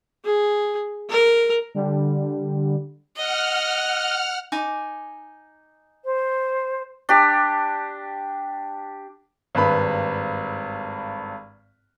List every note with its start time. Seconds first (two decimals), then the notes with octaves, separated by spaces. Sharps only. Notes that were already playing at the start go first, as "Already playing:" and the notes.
0.25 G#4
1.09 A#4
1.74 D3 G3
3.16 D#5 F#5 F6
4.52 D#4 G#5 D6
6.04 C5
7.09 D4 G4
9.55 G#1 G2 B4 B5